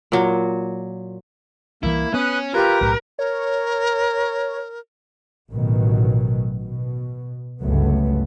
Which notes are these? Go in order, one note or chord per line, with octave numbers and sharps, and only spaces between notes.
A#2 F#3
C2 E3 A#3 E4
B3 C#4 B4 D#6 F#6
F4 G4 A#4 B4
B1 A2 B4
A#4 C#5
A1 B2 D#3 F#3
B2
G1 C#2 F#3 A3 B3